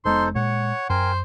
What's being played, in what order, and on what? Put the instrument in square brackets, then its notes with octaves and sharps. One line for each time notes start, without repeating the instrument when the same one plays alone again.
[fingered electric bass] F1 G#3 B3 [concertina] D#4 A4 C5 [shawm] C6
[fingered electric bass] A#2 G#3 [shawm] C#5 [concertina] F#5
[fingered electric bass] F#2 [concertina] A#4 G5 G#5 [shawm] C5